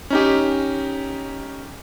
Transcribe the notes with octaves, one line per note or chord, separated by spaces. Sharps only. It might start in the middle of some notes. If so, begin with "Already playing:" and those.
C#4 D#4 G4